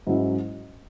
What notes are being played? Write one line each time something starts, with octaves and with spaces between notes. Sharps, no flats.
G#2 F#3 C#4 E4